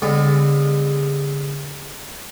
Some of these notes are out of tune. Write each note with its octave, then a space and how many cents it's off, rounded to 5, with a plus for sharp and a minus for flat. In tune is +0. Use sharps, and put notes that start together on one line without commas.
D3 -45 G#3 -40 B3 +20